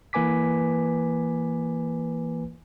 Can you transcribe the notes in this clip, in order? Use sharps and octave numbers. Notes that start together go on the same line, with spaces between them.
E3 A#3 B4 G#5 D6 B6